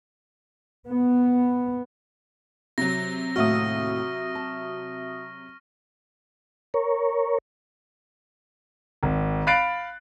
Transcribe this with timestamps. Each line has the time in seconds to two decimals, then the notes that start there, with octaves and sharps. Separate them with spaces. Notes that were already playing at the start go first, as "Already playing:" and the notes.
0.87 B3
2.78 C3 F#3 A#6
3.36 D#2 A2 F#4 E5 F5 C#6 D#6 F6
4.35 A5
6.74 A#4 C#5
9.03 G#1
9.47 F5 B5 F#6 A6 C7 D7